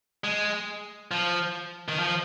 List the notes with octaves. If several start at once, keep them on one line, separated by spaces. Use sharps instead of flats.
G#3
F3
D#3
F3